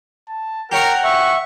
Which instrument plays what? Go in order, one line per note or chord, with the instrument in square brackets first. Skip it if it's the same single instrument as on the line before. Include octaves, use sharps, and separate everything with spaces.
[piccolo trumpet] A5
[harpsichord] G4 C#5 A#5 [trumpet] A#4 [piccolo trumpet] F#5
[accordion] E5 [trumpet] C#6